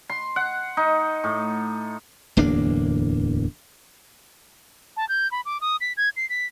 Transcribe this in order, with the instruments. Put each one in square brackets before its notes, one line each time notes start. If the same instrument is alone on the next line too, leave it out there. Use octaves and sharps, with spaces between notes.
[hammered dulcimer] C6
F#5
D#4
A2
[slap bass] D1 E2 A#3 D4
[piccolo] A5
G6
B5
D6
D#6
B6
G#6
C7
B6